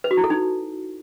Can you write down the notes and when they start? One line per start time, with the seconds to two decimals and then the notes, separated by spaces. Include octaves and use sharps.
0.04 B4
0.11 F#4
0.17 E4
0.24 A4
0.30 D#4